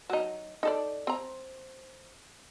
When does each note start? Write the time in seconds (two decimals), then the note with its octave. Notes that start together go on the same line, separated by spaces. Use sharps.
0.10 F#3 D#4
0.63 D#4 A4 D5
1.07 C4 A#5